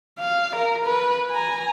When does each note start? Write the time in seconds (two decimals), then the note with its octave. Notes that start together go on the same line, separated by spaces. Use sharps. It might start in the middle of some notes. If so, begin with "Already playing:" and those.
0.19 F5
0.56 A#4
0.85 B4
1.31 G#5 A#5